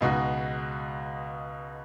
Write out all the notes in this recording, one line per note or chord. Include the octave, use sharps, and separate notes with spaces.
C#2 B2 G#3 D#4 F#4